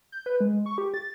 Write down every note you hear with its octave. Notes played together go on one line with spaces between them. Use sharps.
G6
B4
G#3
C#6
G4
A6